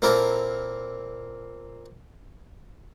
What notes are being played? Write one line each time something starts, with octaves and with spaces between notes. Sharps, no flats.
A#2 A#3 C4 E4 A4 A#4